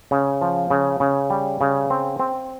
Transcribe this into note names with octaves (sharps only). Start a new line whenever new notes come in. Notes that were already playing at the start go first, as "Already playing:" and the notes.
C#3
F3
C#3
C#3
G3
C#3
C4
C4